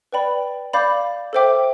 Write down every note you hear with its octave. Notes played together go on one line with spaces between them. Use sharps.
B4 D5 G5 B5
D5 F5 B5 D6 G6
A4 C5 E5 G5 D6